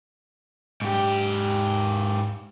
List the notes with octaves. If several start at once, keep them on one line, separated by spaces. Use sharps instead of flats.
G#2 G4